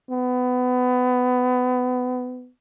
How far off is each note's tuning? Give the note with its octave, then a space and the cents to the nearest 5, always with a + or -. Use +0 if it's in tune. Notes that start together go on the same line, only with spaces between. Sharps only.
B3 +25